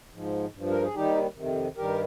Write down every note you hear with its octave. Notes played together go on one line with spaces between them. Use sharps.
G#2 F3
G2 F3
A#4
G#4
D#2 D#3 G3 D#4 G4
F2 C3 D#3
G2 D#3 G3 G4 A#4